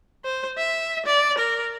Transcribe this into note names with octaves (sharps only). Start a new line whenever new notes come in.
C5
E5
D5
A#4